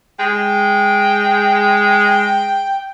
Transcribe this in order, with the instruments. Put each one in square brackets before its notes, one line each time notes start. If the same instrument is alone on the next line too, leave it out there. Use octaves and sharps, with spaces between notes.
[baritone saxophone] G#3 [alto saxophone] G5